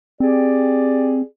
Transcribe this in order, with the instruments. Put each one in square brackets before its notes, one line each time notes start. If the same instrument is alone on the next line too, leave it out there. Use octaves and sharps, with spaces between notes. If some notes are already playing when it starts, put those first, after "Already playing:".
[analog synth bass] C4 [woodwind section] G4 G#4 D5